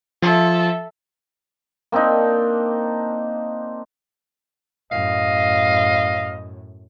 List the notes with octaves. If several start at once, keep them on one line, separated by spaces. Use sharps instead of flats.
F3 A4 E5
A#3 C4 D4 D#4
F#2 A2 D#5 F5